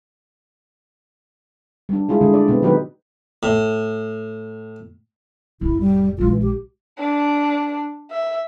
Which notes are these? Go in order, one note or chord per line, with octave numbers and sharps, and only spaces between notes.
G3 D4
G#3 E4 F4 G#4
D3 G#3 A3
D5
B2 B3 C4
D#3 F#3 D#4 G4 B4
A2
F1 A2 E4
G3
A#1 G#3 F4
E3
G4
D4
E5